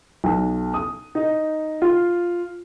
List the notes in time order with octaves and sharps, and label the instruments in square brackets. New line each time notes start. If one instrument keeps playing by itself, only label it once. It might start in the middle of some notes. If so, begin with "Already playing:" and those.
[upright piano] B1
D#6
D#4
F4